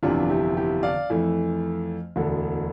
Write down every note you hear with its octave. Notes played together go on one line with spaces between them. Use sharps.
G1 F2 C3 E3 D4 F4
E4 G4
E4 G4
D5 F5
F2 E3 A3
E1 D2 D3